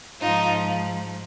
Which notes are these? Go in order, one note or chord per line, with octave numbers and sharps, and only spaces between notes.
G#2 F3 D#4 F4